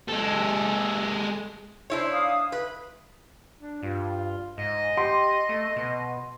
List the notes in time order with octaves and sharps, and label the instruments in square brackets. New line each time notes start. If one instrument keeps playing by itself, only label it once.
[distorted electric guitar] G#3 A4
[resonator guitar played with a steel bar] D4 E4 C#5 [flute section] C5
[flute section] F5 D#6
[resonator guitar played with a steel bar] B4 [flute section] E5
[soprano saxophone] D4
[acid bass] G2 [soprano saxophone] F4
[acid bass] G#2 [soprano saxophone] D#5
[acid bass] G4 [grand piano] C6
[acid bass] A3
B2